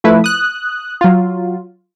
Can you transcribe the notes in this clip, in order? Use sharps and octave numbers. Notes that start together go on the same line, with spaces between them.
F3 A3 E4 B4
D#6 F#6
F#3 F4